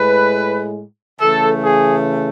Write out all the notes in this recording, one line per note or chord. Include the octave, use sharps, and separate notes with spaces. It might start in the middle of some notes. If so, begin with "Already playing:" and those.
Already playing: A2 G#3 B4
C#3 E3 A3 A4
G#4